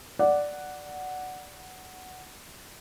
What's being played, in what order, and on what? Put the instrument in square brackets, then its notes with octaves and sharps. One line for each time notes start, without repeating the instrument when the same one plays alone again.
[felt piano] D5 F#5